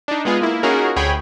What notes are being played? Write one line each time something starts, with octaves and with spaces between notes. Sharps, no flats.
D4 D#4
G#3 B3 F4 G#4
A#3 E4
C#4 D#4 F4 F#4 G#4 A#4
D2 G#4 C#5 G5 B5